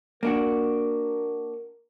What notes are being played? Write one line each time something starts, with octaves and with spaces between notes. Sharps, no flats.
A#3 D4 F#4 A#4